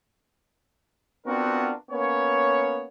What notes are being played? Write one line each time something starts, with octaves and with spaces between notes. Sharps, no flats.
B3 C4 D4 F4 F#4 A#4
A#3 B3 C#4 C#5